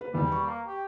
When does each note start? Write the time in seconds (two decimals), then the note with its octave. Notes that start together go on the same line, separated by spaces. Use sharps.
0.01 B4
0.14 E2 D#3 G3
0.32 C#6
0.47 A#3
0.67 G4